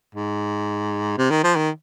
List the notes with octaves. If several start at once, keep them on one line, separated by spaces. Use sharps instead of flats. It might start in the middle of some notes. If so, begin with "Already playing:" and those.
G#2
C3
D#3
F3
D#3